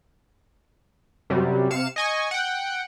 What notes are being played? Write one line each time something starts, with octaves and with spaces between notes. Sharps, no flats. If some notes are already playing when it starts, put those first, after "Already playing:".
F#2 C3 F#3 G3
C3 F5 C#7 E7
D#5 G#5 C#6
F#5 G5